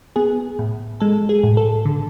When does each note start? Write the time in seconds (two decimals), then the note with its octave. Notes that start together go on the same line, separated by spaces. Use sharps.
0.16 B3 G#4
0.59 A2
1.00 G#3 A4
1.29 G#4
1.43 A2
1.57 A4
1.85 D3